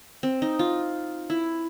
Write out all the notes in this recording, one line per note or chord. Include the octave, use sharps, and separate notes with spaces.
C4
D#4
F4
E4